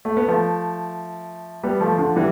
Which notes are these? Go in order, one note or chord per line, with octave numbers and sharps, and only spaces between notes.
A3
B3
F3 A3
G3 B3
F3 A3
D3 F3
E3 G3